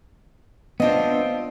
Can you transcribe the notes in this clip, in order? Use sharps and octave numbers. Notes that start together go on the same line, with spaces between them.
B3 C4 D4 F4 D#5